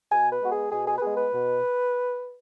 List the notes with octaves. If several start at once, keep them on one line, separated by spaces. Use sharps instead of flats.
B2 G#5
B4
G#3 B3 F#4
G#4
B2 G#4
G#4
B4
G#3 B3 G#4
B4
B2